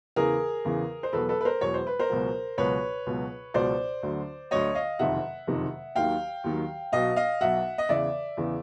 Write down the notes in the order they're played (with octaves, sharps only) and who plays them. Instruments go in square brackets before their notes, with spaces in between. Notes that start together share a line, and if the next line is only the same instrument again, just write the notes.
[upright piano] E2 C#3 E3 G#4 A#4
E2 C#3 E3
C5
E1 E2 B2 F#3 A4 B4
A4 B4
B4
A#4 C5
E1 E2 B2 F#3 C#5
C5
B4
A#4 C5
C#2 B2 F#3
C#2 B2 F#3 B4 C#5
C#2 B2 F#3
C#2 B2 F#3 C5 D5
D2 D3 F#3
D2 D3 F#3 C#5 D#5
D#5 F5
F#1 F2 C3 D#3 E5 F#5
F#1 F2 C3 D#3
D#2 D#3 F#3 F5 G5
D#2 D#3 F#3
B1 B2 F#3 D#5 F5
D#5 F5
B1 B2 F#3 E5 F#5
D#5
E2 C#3 E3 D5 E5
E2 C#3 E3